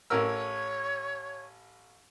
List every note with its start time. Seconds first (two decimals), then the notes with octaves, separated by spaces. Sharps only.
0.10 A1 A#4 C#5 E6